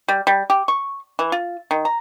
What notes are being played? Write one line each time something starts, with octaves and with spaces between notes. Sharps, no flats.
G3
G3
G4
C#6
E3
F4
D#3
A#5